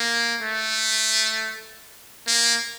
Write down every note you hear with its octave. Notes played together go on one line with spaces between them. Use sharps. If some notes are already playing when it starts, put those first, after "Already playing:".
Already playing: A#3
A3
A#3